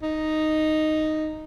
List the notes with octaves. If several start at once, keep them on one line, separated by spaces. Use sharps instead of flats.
D#4